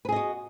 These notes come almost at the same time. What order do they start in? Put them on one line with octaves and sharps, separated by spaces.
B4 G#4 D#5 F#4